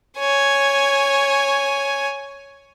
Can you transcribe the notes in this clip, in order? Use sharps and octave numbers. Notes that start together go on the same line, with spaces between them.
C#5 G#5